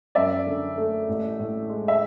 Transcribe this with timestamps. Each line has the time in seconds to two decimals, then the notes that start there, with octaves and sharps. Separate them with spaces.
0.15 F#2 D5 E5
0.47 D3
0.77 A3
1.08 A1
1.39 A2
1.69 G#3
1.88 E5